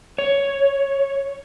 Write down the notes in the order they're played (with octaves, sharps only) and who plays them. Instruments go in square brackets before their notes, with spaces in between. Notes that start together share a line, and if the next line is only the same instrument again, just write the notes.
[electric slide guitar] C#5